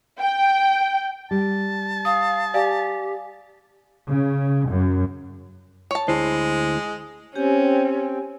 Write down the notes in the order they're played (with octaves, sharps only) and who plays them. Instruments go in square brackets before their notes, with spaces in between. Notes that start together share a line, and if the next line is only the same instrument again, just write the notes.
[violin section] G5
[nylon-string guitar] G3 [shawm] A5
[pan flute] F5 [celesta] D#6
[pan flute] G4 [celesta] D5 F5 G#5
[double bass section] C#3
F#2
[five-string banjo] C#5 A5
[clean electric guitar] D2 E4 C5 [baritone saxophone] G#3
[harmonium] C4 [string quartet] C#4 [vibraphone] G4 G#5